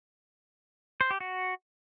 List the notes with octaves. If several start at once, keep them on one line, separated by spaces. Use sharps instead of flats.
C5
G4
F#4